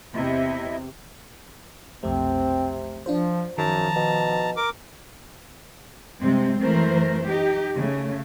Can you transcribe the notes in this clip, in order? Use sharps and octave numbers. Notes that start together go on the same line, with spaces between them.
E2 C3 E4 D#5 E5
B1 F2 C3 A3 C4
F3 D4 F4 C5
F#2 D#3 F3 A5 A#5
B2
A#4 D6
G2 C3 G#3 C4
F#2 E3 A3 A#4 C5
D#4 G4
C#3 A3